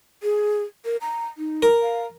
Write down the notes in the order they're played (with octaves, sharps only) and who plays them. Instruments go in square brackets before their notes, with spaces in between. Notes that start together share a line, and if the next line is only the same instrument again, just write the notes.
[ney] G#4
A#4
A#5
D#4
[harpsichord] A#4
[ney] F5